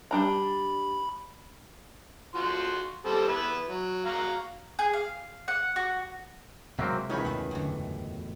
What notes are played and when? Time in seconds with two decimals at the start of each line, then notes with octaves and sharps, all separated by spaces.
0.11 G3 D4 A#5 B5
2.35 F3 F#4 C6
3.05 G3 C4 A4
3.28 B3 E4 B4
3.69 F#3
4.05 F#4 F5 A#5
4.79 G#4
4.93 F5
5.48 F#5
5.76 F#4
6.79 C3 F#3 G#3 A#3 C4 E5
7.10 C#2 D#3 E3 C#4 C#5 B5
7.25 E2 A2 B3 E5
7.51 F#2 D3